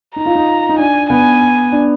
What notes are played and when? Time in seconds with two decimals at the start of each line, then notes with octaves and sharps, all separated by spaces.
0.16 D#4 A#5
0.26 F4
0.35 D#4
0.69 D#4
0.79 D4 G#5
1.10 B3 G#5
1.72 D4